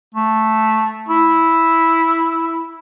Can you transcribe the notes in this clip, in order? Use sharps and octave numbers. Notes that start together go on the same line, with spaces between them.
A3
E4